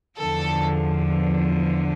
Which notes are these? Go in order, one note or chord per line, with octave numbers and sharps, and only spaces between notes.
E2 D3 F3 A4